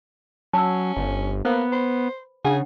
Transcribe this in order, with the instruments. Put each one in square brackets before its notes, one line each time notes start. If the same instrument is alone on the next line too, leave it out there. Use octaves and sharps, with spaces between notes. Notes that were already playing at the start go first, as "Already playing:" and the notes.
[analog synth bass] F#3 [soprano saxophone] C#4 [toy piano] A5 E6
[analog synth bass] G1
[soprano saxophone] A#3 [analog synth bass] B3 [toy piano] B4 C5
[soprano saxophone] C5 [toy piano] B5
[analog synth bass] C#3 [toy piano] D4 F#5 [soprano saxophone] G#4